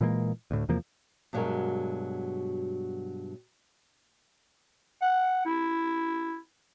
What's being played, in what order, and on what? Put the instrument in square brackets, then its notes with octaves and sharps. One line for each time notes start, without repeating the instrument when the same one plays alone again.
[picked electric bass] A#2 E3 G#3 A#3
D2 A2
E2 C3 F3 A#3
[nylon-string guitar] G2 B2 F#3 G#3 F#4 A#4
[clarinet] F#5
E4